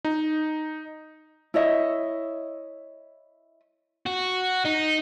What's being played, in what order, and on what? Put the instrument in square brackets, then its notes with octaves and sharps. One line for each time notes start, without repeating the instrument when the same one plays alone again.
[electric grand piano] D#4
[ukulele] E4 C#5 D#5 E5
[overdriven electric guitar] F#4
D#4